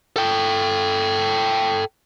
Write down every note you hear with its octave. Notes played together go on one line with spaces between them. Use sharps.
A4 G5